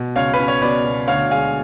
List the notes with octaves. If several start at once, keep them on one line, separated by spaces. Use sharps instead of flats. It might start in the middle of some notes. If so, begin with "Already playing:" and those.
Already playing: B2
C#2 C#5 F5
B4
C#4
C#5
B2 B4 D5
B2
D2 C#5 F5
G#3 F5 G#5